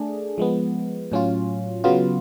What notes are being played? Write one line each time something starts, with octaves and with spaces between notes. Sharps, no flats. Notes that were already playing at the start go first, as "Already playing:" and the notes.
Already playing: A3 D4 G#4
F3 G#3 B3
A2 F#3 C#4 F4
C#3 F#3 B3 F4